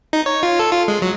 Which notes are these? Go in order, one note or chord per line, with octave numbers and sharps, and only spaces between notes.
D#4
C#5
F4
A4
F4
G#3
F#3